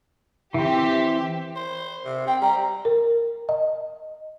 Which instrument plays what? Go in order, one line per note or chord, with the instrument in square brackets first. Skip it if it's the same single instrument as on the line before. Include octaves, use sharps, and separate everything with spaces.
[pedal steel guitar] E3 C4 [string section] G4 E5
[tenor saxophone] C5
C3
[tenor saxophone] C4 [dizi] G5
[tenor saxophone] G3 [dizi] A#5
[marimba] A#4
D#5